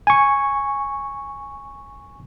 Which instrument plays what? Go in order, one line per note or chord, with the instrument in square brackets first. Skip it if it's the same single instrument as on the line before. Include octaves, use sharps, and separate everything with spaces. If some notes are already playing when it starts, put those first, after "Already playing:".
[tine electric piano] G#5 C#6